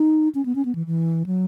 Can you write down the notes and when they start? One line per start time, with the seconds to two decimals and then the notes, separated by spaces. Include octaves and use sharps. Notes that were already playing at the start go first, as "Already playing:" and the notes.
Already playing: D#4
0.35 C#4
0.46 B3
0.55 C#4
0.65 B3
0.75 E3
0.87 E3
1.26 F#3